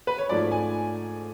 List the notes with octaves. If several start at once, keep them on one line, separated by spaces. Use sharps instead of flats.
B4
C#5
G#2 F3 A3 D5
G#5